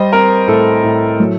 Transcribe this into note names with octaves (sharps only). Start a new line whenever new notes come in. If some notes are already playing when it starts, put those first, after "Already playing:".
Already playing: G3 C5 D#5
C4 A#4
A2 A4
A2
F#3